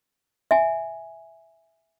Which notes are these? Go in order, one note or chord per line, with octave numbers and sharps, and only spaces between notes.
E5 G#5